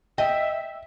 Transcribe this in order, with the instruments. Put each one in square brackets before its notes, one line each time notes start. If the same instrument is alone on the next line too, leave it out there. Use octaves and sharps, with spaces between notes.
[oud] D#5 [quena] E5 [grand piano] G5